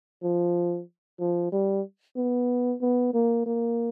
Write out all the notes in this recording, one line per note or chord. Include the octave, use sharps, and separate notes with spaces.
F3
F3
G3
B3
B3
A#3
A#3